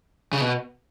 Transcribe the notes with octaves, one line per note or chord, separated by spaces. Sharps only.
C#3
B2